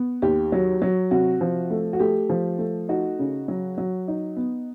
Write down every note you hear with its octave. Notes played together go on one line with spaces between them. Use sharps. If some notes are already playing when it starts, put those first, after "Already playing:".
Already playing: B3
D#2 G4
F#3
F#3
C3 F#4
F3
A3
F#4
A3 G4
F3
A3
D#4 F#4
C#3
F#3
F#3
D#4
B3